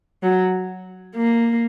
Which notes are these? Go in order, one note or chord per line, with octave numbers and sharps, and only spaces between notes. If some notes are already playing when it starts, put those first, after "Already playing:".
F#3
A#3